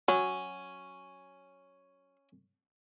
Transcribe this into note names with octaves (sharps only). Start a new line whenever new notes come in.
F#3 C#4